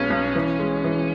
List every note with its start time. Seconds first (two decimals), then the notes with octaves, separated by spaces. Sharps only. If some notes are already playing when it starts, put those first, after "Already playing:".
Already playing: B1 G#3 B3 C#4
0.10 B1
0.35 E3
0.59 G#3
0.84 E3